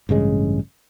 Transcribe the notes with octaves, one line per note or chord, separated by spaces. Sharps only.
A1 G2 C#3 G#3